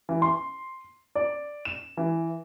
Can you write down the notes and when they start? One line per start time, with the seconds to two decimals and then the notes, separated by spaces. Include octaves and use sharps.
0.09 E3
0.22 C6
1.15 D5
1.65 E7
1.97 E3